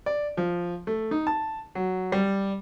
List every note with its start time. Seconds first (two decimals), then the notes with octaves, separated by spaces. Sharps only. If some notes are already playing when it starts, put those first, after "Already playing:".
0.06 D5
0.37 F3
0.87 A3
1.11 D#4
1.27 A5
1.75 F#3
2.12 G3